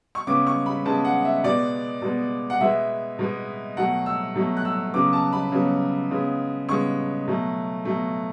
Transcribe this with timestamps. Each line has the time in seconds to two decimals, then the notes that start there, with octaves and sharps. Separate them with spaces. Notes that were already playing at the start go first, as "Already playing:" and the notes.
0.15 C#6
0.27 C#3 G#3 B3 D6
0.47 C#6
0.66 B5
0.86 C#3 G#3 B3 A5
1.05 F#5
1.25 E5
1.44 B2 G#3 B3 D5
2.02 B2 G#3 B3
2.50 F#5
2.61 B2 G#3 B3 E5
3.19 B2 G#3 B3
3.77 B2 F#3 A3 F#5
4.06 E6
4.35 B2 F#3 A3
4.57 F#6
4.65 E6
4.94 C#3 F#3 B3 D6
5.13 A5
5.33 B5
5.52 C#3 F#3 B3
6.11 C#3 G#3 B3
6.69 C#3 G#3 B3 C#6
7.27 B2 F#3 A3
7.85 B2 F#3 A3